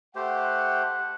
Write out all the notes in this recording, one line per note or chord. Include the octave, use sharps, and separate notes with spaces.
A3 G4 C5 F#5